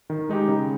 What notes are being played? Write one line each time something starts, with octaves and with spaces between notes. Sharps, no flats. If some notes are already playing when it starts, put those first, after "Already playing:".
D#3
G#3 D#4 G4
C#3